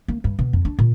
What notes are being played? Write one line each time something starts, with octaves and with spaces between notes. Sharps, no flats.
A#3
G2
B2
F2
D4
A#2